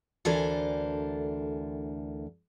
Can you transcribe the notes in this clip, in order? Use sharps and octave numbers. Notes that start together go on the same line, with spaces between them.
D2 E3 D4 A4 A#4 C5